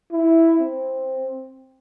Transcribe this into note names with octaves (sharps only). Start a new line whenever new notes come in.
E4
C4